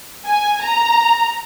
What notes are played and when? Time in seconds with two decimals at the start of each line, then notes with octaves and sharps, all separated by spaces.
0.27 G#5
0.62 A#5